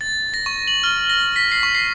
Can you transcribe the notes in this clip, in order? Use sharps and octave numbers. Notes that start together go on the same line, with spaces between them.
A6
A#6
C#6
F#7
F6
A#6
B6
C7
C#6
C7